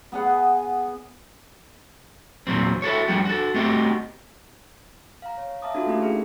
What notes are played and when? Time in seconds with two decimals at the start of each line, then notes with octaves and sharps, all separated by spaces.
0.12 B3 G#4 F#5
2.47 E2 A#2 F3 F#3 C4
2.82 E4 F#4 A4 C#5
3.08 F3 G3 C#4 F#4 G4
3.25 F#4 A4
3.54 A3 B3 C4 D#4 F#4 G4
5.22 F5 A#5
5.37 C#5
5.62 E5 F5 A5 A#5 D6 D#6
5.75 D4 F4 F#4 A4 F5
5.86 A3 A#3 C#4 E4 G4 A4
6.02 E4 G4 G#4 A#4